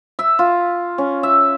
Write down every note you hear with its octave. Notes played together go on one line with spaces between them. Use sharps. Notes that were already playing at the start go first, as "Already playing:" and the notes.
E5
F4
C#4
E5